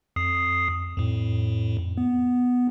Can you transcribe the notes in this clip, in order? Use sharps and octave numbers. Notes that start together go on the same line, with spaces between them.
F2 D#6 C7
F2 A2
B3